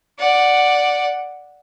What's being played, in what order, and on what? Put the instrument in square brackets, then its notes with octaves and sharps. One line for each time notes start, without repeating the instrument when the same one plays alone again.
[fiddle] D5 F#5